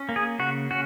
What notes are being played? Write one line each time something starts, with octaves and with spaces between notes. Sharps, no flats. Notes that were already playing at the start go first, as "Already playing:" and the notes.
Already playing: C#4
A#3
G#4
C#3 F#4
C#4 F#4